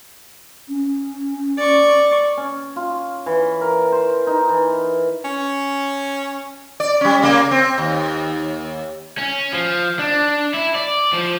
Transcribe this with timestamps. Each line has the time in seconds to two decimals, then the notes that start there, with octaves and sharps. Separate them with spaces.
0.69 C#4
1.57 D5 C#6
2.37 C#4
2.76 F4
3.26 E3
3.61 A#4
3.92 C5
4.27 D#4
4.49 E3
5.25 C#4
6.80 D5
7.01 G3 C#4
7.22 C#3 A#3
7.51 C4
7.78 D#2
9.18 C#4
9.53 F3
9.99 D4
10.54 E4
10.75 D5
11.13 F3